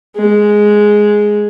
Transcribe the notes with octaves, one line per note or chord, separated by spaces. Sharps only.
G#3